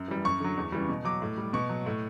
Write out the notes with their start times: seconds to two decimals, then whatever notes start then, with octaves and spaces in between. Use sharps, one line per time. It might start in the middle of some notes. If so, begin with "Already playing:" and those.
Already playing: F#2
0.08 E3 G3
0.24 F#2 C#6
0.40 D3 F#3
0.57 E2
0.72 C#3 E3 G3
0.89 B2
1.05 F#3 D6
1.22 A2
1.37 G3
1.53 B2 C#6
1.69 F#3
1.86 A2